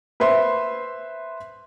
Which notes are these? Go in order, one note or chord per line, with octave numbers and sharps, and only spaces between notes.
B4 C5 E5 C6